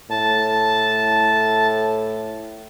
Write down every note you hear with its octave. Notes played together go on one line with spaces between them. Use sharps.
A2 A5